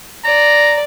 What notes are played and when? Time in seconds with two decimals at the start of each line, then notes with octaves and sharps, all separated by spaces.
0.25 D5 A#5